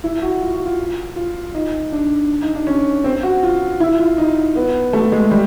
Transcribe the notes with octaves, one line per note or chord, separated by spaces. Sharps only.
E4
F#4
F4
F#4
F4
F4
D#4
D4
D#4
D4
C#4
C4
F#4
F4
E4
F4
D#4
B3
A3
G#3
G3